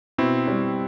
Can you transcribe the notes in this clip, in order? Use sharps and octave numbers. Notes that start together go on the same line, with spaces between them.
B2 C4 E4
G3